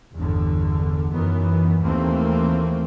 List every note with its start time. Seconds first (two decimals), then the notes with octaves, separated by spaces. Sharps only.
0.15 G1 E2 D3
1.11 F#2 D#3 E3 B3
1.81 D#2 E3 A3 A#3 C4